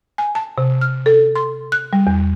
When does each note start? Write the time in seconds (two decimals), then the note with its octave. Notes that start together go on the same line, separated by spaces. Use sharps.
0.18 G#5
0.35 A5
0.58 C3
0.81 F6
1.06 A4
1.36 C6
1.72 F#6
1.93 G3
2.07 E2